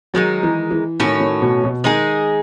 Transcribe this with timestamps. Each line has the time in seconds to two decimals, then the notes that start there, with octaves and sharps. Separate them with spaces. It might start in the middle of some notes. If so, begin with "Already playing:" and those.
0.14 D#3 F#3 G#3 D#4
0.43 E3
0.71 E3
1.00 A2 D#3 F#3 C#4
1.20 D#3
1.42 B2
1.64 B2
1.84 D#3 G#3 D#4 G#4